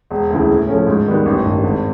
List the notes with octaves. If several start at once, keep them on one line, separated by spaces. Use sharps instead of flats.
E1
D2 C#3 E3
A2
F3 A3 C#4
G#2
D#3 G3 B3
A1
G2 D#3
G#1